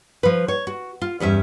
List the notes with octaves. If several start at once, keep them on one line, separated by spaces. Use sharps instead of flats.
F3 B4
C#5
F#4
F4
E2 G2 C#4 E5